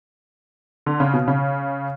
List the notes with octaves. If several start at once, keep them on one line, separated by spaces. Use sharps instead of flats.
D3
C#3
B2
C#3